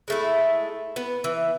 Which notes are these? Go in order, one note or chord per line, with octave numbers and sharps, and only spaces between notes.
G#3 A3 E4
B3
E3